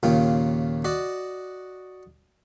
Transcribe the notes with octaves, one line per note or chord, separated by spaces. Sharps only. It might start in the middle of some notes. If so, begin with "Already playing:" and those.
D#2 A#2 C#3 F4 G5
F#4 D5 D#5